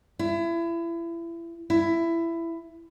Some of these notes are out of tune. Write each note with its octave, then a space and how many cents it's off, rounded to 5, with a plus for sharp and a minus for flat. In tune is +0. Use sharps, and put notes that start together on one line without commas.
E4 +30
E4 +15